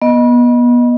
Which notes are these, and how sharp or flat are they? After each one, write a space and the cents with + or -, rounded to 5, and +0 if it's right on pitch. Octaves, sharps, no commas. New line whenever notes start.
B3 -30 D#5 +0